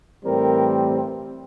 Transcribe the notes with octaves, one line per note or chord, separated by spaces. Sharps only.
A2 E3 G3 C4 A#4